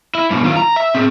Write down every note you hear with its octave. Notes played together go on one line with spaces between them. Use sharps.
E4
G2 B2
D#3 F4
A#5
E5
C4 G#4